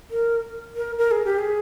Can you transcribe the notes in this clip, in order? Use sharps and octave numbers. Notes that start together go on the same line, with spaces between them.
A#4
A#4
A#4
G#4
G4
G#4